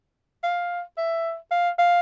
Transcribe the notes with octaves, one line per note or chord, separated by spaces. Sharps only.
F5
E5
F5
F5